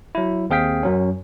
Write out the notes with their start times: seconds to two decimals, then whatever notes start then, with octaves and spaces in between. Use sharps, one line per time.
0.15 F#3 E4
0.50 D#2 C4 G#4 F5 G5 B6
0.83 F#2 F#3 C#4